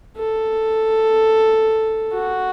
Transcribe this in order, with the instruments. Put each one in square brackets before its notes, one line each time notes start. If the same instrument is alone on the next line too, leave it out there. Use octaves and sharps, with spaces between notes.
[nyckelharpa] A4
F#4